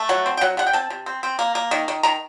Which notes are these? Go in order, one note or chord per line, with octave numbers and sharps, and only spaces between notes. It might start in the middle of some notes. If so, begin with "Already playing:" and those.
Already playing: A3
F#3 F#5
C4
G5
F#3 F#5
C3 F#5
G5
C4 A5
C3
C4
C4
A#3
A#3
D#3
D#3
D#3 A#5